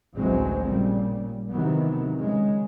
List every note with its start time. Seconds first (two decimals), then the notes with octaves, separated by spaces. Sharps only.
0.15 A1 D2 E3 F#3 G#3 C4
0.62 A#2 C#3 G3
1.51 C3 D#3 E3 F#3 B3
2.18 C#3 G#3